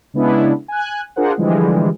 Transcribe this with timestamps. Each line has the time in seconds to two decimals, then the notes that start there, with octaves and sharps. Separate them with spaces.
0.14 C#3 G#3 B3 D4 E4
0.68 G#5 F#6
1.16 D4 F4 G#4 A#4 C5 F#5
1.38 D3 E3 F3 G3 G#3